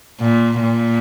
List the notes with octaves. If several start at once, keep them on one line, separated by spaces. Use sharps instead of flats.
A#2
A#2